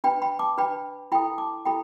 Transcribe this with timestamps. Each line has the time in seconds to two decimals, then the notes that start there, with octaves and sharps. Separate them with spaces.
0.04 D4 B4 G5 B5
0.22 G5 B5
0.39 A5 D6
0.57 D4 B4 G5 B5
1.12 E4 A4 G5 B5
1.38 A5 D6
1.65 E4 A4 G5 B5